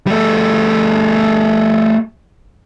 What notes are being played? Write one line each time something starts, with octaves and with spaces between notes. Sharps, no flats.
G3 A3